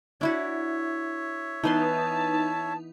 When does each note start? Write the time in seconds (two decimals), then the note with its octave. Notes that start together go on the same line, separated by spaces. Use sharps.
0.21 D4 E4 F#4 C#5 E5
1.64 E3 B3 D#4 B4 A5 C6